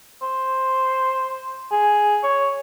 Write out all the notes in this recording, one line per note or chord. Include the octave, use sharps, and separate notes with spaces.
C5
G#4
C#5